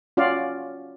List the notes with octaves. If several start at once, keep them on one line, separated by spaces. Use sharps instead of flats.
C#4 F4 F#4 D5 F5